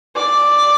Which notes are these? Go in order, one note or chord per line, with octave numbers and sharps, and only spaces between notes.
D5